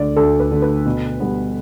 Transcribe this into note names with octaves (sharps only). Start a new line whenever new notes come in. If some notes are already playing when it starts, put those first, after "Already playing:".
Already playing: D2 D3 A3 D5
D2 A4
B4
D3 A3
B4
B2
G3 B3